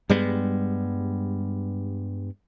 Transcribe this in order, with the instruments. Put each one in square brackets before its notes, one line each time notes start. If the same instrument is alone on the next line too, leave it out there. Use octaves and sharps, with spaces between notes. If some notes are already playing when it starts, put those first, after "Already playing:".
[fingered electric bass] G2 G3 G#3 B3